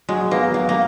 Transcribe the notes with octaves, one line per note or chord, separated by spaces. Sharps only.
F#3 G#3
A#3 B3
F#3 A#3
A#3